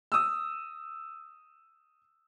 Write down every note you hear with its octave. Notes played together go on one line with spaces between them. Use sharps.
D#6 E6